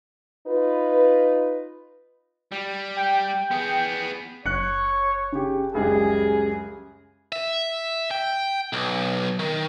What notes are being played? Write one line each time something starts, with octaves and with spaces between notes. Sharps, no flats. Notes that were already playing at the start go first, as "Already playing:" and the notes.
D#4 F4 B4
G3
G5
B3 G#4
F#1 C#5 F#6 C#7
C#3 G4
C#2 F#2 G3 G#4
E5
G5
B1
D#3